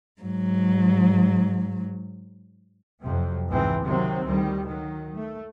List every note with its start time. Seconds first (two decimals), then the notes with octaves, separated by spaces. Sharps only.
0.22 G#2 F#3
3.00 F2 C3 F#3
3.48 C#2 G#2 E3 C4
3.83 C3 D#3 F#3 C4
4.26 D2 D#3 G3
4.65 D#3 F#3
5.15 A3